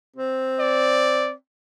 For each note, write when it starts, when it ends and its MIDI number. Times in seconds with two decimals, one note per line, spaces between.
0.16 1.34 60
0.60 1.33 74